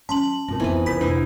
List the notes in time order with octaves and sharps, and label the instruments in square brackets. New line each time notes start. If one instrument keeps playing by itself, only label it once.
[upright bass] F#3 [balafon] C#4 [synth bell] A5 C6 F#7
[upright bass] G#2 [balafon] C4 F4 A#4
[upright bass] F2 C4 [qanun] E3 D#4 B4 [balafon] B3 C5 E5
[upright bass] C#3 [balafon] F4 A#4 C5 [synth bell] B5 B6
[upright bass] F1 A#1 [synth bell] D4 [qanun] E4 A#4 D#5 [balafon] B4 B5